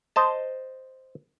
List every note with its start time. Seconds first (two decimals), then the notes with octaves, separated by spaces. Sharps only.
0.16 C5 D#5 A5